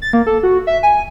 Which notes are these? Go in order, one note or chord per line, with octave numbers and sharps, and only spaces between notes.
A6
A#3
A4
F#4
E5
G#5